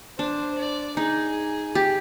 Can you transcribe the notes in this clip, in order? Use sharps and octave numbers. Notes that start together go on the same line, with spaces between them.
D4 C5
D5
D#4 G#4
G4